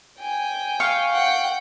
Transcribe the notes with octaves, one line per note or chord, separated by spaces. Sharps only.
G5 G#5
F5 C#6
F#5 G5